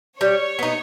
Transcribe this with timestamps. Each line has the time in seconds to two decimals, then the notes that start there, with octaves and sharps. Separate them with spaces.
0.20 G3 C#5
0.59 B3 D#4